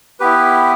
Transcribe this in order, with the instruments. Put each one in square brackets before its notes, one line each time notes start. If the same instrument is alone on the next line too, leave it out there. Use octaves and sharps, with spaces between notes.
[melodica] B3 E4 G4 B4